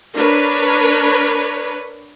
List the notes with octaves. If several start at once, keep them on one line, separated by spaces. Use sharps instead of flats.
D4 A#4 B4 C#5